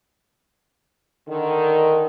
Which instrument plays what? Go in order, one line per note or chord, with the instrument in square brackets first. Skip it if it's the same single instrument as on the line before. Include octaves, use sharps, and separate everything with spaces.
[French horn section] D3 D#3